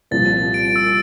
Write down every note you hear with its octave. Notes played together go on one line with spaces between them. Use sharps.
C2 A#2 F3 C4 A6
D7
D7
E6